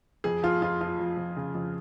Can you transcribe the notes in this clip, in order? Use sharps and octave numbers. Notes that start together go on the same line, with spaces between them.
F2 G#4
F3 F4
F2 F4
F3 F4
F3
F2
C#3
F2